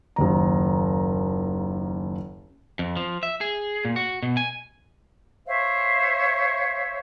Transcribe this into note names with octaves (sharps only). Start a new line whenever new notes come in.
F#1 D#2 A#5
F2
F3
E5
G#4
A#2
F#4
B2
G#5
C5 C#5 E5 F5